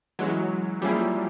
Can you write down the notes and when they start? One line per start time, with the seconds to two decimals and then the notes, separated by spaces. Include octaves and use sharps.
0.19 E3 F#3 G#3 C#4
0.81 F3 G3 A#3 C#4 E4 G#4